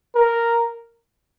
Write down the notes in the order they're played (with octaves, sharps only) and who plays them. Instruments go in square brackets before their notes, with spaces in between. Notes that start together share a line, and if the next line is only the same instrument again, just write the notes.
[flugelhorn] A#4